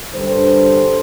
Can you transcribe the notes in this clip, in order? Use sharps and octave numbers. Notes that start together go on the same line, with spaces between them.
G2 D3 G3 A4 C5